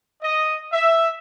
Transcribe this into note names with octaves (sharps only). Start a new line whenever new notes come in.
D#5
E5